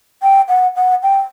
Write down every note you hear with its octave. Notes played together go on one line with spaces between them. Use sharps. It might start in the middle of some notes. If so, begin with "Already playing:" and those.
G5
F#5
F#5
G5